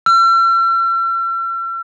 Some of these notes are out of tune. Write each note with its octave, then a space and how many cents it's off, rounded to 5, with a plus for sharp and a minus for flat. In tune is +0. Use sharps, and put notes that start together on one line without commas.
E6 +45